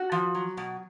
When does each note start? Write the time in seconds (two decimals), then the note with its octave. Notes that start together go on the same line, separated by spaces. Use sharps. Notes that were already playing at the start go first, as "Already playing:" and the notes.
Already playing: F#4
0.12 F3
0.35 F#3
0.57 B2